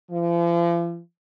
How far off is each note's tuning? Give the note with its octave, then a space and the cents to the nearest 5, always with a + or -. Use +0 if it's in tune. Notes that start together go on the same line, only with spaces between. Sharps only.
F3 -40